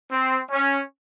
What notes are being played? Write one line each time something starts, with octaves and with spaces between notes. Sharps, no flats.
C4
C#4